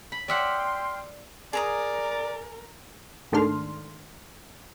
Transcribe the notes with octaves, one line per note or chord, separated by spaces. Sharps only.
B5
D5 E5 F#5 G5 C6 F6
G#4 A#4 D5 A#5 D#6
G#2 D#3 A3 D4 C6 F6